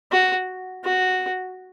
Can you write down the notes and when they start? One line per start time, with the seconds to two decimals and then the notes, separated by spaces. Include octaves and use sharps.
0.12 F#4
0.85 F#4